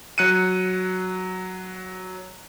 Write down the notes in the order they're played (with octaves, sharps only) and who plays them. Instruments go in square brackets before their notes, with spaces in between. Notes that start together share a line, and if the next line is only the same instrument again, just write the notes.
[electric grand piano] F#3 F#6 C#7 D#7